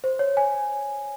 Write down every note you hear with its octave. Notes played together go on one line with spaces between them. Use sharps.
C5
C#5
G#5